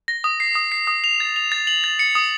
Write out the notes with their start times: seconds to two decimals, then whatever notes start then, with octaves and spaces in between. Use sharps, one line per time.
0.08 A#6
0.24 D#6
0.40 C7
0.55 D#6
0.72 C7
0.87 D#6
1.04 F7
1.20 A6
1.36 F7
1.52 A6
1.67 F#7
1.84 A6
1.99 C#7
2.15 D#6